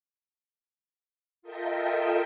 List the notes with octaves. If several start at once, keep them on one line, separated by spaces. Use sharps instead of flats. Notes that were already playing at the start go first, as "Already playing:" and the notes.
F4 A4 A#4 D#5 E5 G5